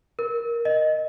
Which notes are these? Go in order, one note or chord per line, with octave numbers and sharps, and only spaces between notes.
A#4
D#5